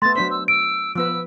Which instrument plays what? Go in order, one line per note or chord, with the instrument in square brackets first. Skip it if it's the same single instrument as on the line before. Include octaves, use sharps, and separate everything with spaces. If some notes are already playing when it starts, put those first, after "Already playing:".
[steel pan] A3 B3 [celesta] C6 [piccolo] A6
[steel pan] F#3 D4 C5 [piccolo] B6
[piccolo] E6
[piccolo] E6 [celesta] D7
[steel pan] F3 B3 B4 [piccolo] E6